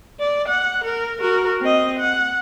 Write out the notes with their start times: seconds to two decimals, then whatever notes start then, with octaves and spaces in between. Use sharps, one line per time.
0.20 D5
0.48 F#5
0.84 A#4
1.20 F#4 A#4
1.61 C4 D#5
1.99 F#5